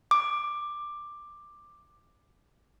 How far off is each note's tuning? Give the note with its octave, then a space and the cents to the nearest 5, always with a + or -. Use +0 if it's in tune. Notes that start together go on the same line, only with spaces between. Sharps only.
D6 +10